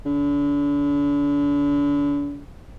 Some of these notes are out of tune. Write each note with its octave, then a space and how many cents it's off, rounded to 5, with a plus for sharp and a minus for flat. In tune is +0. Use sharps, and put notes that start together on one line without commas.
D3 -40